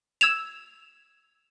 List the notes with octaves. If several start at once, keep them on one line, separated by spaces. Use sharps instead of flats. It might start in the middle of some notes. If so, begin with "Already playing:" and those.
E6 G#6 E7 F7